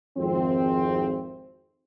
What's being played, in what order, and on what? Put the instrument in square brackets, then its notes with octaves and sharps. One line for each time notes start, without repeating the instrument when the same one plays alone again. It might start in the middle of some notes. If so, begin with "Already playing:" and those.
[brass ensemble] G#1 F2 C4